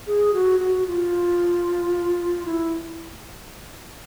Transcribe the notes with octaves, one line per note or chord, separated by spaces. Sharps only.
G#4
F#4
F#4
F4
E4